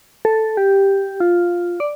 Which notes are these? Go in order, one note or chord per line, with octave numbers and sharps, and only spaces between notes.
A4
G4
F4
D5